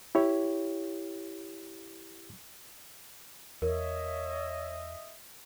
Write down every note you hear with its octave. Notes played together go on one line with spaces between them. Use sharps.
E4 G4 C#5
E2 A#4 C#5 D#5 E5